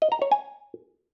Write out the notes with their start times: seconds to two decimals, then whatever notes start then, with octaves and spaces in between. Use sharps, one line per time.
0.02 D#5
0.12 A#5
0.22 C#5
0.32 G#5